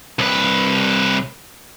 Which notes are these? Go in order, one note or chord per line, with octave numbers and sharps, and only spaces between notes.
C2 B4